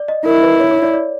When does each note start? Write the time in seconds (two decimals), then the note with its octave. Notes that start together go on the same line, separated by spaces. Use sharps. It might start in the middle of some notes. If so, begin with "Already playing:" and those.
Already playing: D5
0.08 D#5
0.26 E4 A#4
0.43 B4
0.60 C#5
0.71 C#5
0.83 D5
0.94 D5